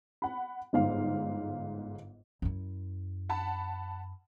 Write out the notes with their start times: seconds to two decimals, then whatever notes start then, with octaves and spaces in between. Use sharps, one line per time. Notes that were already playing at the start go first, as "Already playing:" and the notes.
0.22 F#5 B5
0.73 G1 G#2 F5
2.42 F#2 E4
3.29 F#5 A5 B5